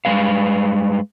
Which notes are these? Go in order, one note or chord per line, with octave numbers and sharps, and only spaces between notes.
G2 G3 G#3 B4 F5